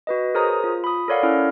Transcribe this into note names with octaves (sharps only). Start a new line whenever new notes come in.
F#4 B4 D#5
G#4 A#4 C5 C#5 A#5 D#6
F4
B5 D#6
A4 A#4 C#5 D5 F5 F#5
C#4 E4 A4 F6